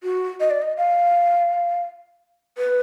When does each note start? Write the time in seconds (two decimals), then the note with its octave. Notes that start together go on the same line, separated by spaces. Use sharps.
0.04 F#4
0.40 D#5
0.51 D5
0.62 D#5
0.77 F5
2.58 B4